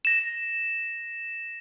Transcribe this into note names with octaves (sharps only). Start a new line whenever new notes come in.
A#6 E7